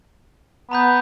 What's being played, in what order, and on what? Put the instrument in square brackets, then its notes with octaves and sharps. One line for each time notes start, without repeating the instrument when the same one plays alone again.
[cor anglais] B3 [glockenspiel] A#5 B5 G6